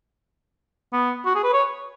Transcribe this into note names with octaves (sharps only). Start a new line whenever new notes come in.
B3
F#4
G#4
B4
C#5